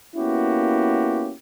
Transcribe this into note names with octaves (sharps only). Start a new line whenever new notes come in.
A#3 B3 C#4 E4 F#4 G4